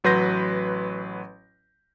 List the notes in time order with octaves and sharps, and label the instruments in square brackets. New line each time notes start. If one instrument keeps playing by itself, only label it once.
[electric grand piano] A1 F#3 B4 C6 G6 A#6